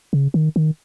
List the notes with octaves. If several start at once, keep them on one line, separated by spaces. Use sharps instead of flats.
C#3
D#3
D#3